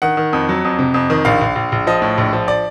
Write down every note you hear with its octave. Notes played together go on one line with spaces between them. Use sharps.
D#3 F#5
D#3
F2
F#3
F2
C3
F2
D#3
A#1 F5
A#1
A#1
A#1
F3 D#5
A2
A#1
F3
D5